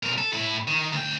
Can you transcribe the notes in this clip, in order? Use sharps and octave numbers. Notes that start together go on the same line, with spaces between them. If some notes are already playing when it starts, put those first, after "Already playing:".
B1 A#4
A4
A2 E4
D#3
D2 G5